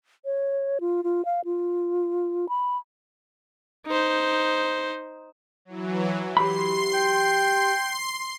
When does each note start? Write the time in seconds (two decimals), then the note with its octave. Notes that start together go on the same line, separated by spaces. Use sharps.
0.25 C#5
0.80 F4
1.04 F4
1.25 F5
1.45 F4
2.49 B5
3.86 D#4 C5
5.65 E3 F#3
6.37 G4 B5 C6 C7
6.94 G5